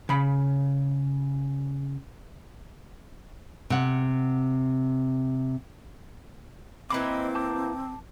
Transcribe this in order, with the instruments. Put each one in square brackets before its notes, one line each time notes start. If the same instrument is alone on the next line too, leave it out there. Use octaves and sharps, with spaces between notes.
[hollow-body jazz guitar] C#3 B5
[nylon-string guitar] C3 F#5
[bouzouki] E3 A#3 [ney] C4 [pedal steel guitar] D#5 B5 D6
[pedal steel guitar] A5 D6 G6